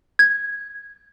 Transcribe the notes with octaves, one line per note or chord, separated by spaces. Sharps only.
G#6